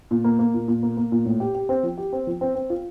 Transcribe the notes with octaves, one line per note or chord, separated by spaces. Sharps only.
A#2
A#3
A#3
A#2
A#2
A#3
A#3
A#2
A2
G4
G4
C4
F3
G4
C4
F3
C4
C4
F4